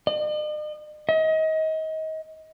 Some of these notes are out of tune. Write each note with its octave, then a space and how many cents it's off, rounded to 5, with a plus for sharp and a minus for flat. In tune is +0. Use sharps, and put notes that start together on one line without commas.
D#5 -45
D#5 +30